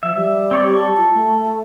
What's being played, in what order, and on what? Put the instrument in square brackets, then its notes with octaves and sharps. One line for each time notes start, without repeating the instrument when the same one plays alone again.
[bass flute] F3 [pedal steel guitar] E5
[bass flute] G3
[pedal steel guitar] C4 C#5 D5
A4 C#6
[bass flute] F4
A3